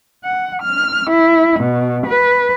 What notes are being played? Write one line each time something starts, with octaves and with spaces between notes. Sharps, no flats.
F#5
F6
E4
B2
B4